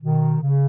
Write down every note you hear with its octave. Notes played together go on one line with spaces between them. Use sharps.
B2 D#3
C#3